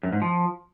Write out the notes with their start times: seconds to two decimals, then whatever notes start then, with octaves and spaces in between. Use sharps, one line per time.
0.03 F#2
0.13 G#2
0.22 F3